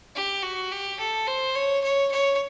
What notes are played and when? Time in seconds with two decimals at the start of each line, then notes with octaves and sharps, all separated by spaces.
0.16 G4
0.43 F#4
0.71 G4
0.99 A4
1.27 C5
1.55 C#5
1.84 C#5
2.12 C#5